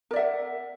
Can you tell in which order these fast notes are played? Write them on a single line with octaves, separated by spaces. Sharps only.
A#4 D5 E5 F#5